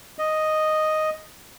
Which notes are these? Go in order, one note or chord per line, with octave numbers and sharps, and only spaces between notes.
D#5